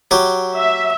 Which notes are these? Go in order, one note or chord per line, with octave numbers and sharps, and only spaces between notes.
F#3 G4
E5